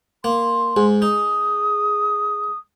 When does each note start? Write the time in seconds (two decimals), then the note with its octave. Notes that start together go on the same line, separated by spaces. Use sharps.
0.24 A#3 C6
0.76 G#2 G#4
1.02 D#4 D#6